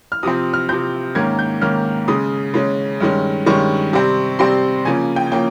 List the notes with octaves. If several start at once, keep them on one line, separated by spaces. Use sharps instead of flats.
F6
C3 F3 C4 D#6
F6
C3 F3 C4 G6
G#2 D#3 A#3 C#4 G#6
G6
G#2 D#3 A#3 C#4 F6
C#3 G#3 C#4 D#6
C#3 G#3 C#4
G2 D#3 G#3 C#4
G2 D#3 G#3 C#4 C#6
C3 G3 C4
C3 G3 C4 C6
C#3 F3 A#3 C#4 G#5
G5
F3 A#3 C#4 G5